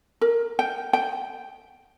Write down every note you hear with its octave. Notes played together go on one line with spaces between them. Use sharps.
A#4
G5
G5